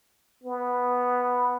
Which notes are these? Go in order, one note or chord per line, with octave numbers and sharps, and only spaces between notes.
B3